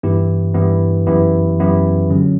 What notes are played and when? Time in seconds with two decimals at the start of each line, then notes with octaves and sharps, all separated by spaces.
0.03 G2 E3 B3 E4 G4
0.54 G2 E3 B3 E4 G4
1.07 F#2 E3 B3 E4 G4
1.59 F#2 E3 B3 E4 G4
2.10 D3 F#3 C#4